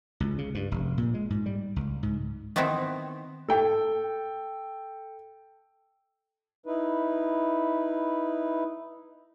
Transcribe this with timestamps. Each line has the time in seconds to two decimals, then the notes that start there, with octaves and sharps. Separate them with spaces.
0.20 C#2
0.38 C#3
0.55 G2
0.72 F1
0.98 A#2
1.14 G#3
1.30 G#2
1.46 G3
1.76 C#2
2.03 G#2
2.56 D#3 B3 C4 D#4 E4
3.48 A4 G5
6.66 D#4 E4 B4